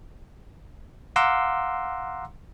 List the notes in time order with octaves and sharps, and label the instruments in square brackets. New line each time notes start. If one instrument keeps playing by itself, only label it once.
[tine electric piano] F5 F#5 A#5 C6 D6 E6